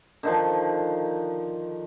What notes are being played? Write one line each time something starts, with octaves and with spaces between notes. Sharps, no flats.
D3 D#3 F3